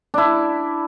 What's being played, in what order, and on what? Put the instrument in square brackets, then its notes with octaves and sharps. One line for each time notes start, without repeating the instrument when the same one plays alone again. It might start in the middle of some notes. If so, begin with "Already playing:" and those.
[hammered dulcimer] D4 E4